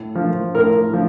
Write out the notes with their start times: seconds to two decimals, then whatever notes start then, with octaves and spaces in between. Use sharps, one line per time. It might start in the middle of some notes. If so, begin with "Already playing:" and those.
Already playing: A2
0.15 F3
0.54 A2 A#4
0.93 F3